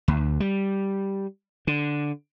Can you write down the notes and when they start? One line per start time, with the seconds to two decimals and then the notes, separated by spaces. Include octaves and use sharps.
0.08 D2
0.40 G3
1.67 D3